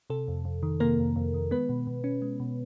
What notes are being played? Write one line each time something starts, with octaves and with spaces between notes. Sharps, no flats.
C3 A4
F2
F2
D#3
C3 A#3 A#4
F2
F2
D#3
G#3 B3 B4
B2
B2
C#4
G#3
B2